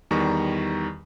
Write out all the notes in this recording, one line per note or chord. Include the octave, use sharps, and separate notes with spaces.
E2 D#3 G3 A#5 C#6